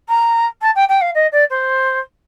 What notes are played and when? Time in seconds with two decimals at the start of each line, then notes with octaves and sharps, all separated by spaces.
0.08 A#5
0.61 A5
0.75 G5
0.89 G5
1.01 F5
1.14 D#5
1.32 D5
1.50 C5